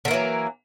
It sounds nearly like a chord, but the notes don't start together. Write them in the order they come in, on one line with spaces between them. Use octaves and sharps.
D3 A#3 E3 F#3